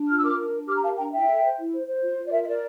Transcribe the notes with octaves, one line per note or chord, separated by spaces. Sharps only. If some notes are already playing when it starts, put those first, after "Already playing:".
Already playing: D4
F4 F6
E6
A#4 D6 F6
D4
D4
G4 D6 F6
A#5
A#4 F5 A5
D4 G5 A#5
E4 E5 G5
A4
C5
E4
C5
C5
F4
F4
D5
A#4 E5
E5
A#4 D5